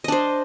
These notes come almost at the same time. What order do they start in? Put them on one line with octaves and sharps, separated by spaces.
D#5 D4 C5